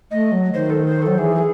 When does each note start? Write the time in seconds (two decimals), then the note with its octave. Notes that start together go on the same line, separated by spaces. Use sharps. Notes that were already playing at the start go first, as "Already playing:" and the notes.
0.11 A3 D#5
0.32 F#3
0.54 D#3 C5
0.70 A4
0.86 C5
1.02 F#3 A4
1.18 E3 G#4
1.35 G#4